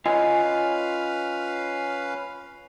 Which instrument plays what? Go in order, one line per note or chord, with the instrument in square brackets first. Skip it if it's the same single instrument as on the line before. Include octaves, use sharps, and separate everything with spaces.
[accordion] C#4 B4 F5 [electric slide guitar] F4 G#5 [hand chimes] D#5